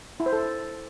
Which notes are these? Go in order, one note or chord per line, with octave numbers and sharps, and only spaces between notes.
E4
C5
A4